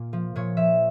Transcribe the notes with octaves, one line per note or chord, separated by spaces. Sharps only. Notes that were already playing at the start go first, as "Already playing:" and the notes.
Already playing: A#2 A#3
F3
A#2 C#5
F3 E5